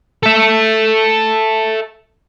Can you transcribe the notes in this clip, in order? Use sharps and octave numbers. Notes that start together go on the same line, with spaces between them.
A4 E5